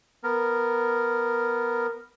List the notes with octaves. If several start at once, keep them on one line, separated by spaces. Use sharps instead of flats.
B3 A#4